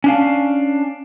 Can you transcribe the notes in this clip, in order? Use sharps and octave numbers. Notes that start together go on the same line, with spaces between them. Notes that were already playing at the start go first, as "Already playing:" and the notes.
C#4 D4 F5